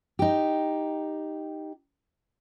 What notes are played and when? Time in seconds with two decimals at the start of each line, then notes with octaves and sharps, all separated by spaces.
0.19 D#4 G4